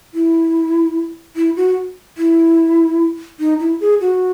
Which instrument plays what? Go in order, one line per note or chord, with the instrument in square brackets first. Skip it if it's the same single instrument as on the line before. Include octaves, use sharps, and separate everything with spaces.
[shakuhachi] E4
E4
F#4
E4
D#4
E4
G#4
F#4